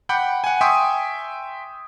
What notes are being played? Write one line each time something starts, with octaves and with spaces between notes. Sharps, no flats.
F#5 G5 B5 D6 G6
F#5 G#5
E5 G5 G#5 C6 C#6 D#6